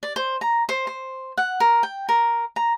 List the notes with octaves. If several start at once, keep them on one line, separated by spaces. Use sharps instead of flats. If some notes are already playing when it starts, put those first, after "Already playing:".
D5
C5
A#5
C5
C5
F#5
A#4
G5
A#4
A#5